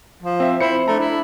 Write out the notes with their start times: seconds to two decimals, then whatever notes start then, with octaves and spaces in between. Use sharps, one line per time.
0.23 F3
0.40 C4 E5
0.61 E4 C5 C#7
0.88 A3 D4 A#5
1.00 E4